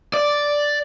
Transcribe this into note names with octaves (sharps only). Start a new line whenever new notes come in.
D5